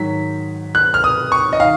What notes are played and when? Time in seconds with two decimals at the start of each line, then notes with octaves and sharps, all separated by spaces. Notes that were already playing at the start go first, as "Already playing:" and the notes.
Already playing: G#2 D#3 F#3 B6
0.75 F#6
0.94 F6
1.04 D#6
1.32 C#6
1.53 D#5
1.60 D#3 F5